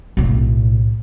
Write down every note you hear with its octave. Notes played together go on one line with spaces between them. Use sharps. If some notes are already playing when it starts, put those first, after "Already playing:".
B1 A2